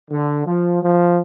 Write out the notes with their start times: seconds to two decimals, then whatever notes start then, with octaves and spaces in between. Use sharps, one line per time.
0.10 D3
0.46 F3
0.83 F3